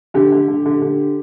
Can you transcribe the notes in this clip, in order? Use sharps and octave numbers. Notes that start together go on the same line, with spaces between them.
D3 G4
D3
D3
D3
D3